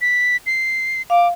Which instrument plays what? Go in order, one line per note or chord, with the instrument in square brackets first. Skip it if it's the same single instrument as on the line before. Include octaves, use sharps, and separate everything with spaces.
[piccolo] B6
C7
[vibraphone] F5 [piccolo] D6